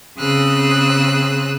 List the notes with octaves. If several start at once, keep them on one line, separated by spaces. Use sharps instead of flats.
C#3 C4 G#4 D#6 E6 F#6